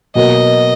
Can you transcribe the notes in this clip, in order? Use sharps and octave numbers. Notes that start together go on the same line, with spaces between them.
B2 F#3 A#3 D#5